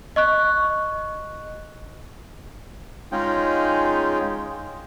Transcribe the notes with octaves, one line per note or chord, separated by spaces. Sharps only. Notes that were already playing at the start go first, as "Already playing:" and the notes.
D#5 C#6 F#6
G#3 C#4 D#4 F4 G#4 G5